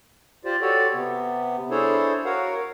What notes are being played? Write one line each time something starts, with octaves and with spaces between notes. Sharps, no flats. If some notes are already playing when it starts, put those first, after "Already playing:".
F4 G4 C5 D5
F#4 G4 A4 C#5 D5
C3 B3
D4 E4 G#4 A4 C5 C#5
F#4 A#4 C#5 F5 F#5